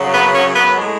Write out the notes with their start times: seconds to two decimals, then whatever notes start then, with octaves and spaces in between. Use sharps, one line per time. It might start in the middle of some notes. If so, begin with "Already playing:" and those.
Already playing: F#2 C#3 F#3
0.12 B3
0.34 C#4
0.55 B3
0.77 A2 G#3